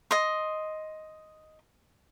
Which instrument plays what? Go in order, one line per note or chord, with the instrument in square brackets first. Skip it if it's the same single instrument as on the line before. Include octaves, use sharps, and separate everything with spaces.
[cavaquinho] D#5 C6